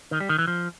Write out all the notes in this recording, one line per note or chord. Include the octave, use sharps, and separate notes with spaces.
D#3
G3
D#3
E3
F3